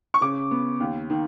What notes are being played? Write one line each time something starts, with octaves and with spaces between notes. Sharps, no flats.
C#6
C#3 D6
B3
D#2
D#3